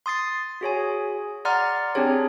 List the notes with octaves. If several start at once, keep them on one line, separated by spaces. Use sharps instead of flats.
C6 D#6 A6 C7
F#4 G#4 C#5 G#5
D5 F#5 A#5 C6 F6 A6
C4 D4 G4 G#4 C#5